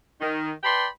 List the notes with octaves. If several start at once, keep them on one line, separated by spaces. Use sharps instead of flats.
D#3
B4 D5 G5 A5 B5 C6